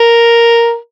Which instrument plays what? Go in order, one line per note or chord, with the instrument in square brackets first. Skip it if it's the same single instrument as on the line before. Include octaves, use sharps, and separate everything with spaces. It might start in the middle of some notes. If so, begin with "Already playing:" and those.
Already playing: [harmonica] A#4